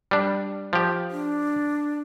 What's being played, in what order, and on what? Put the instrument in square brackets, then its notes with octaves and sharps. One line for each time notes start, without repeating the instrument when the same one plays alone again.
[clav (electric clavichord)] G3 D4
F3 G4
[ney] D4